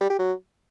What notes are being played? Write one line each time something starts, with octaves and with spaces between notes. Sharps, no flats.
G3
G4
F#3